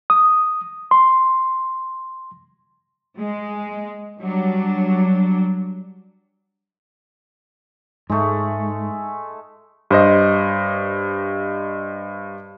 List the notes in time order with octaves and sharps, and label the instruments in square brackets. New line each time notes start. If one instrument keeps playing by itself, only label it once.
[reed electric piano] D#6
C6
[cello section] G#3
F#3 G3 D4
[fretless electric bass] G#2 [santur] G#3 A3
[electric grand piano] G2 C5 D#5